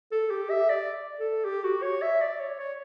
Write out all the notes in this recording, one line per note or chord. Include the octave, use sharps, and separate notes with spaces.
A4
G4
E5
D5
A4
G4
F#4
C#5
E5
D5
C#5
C#5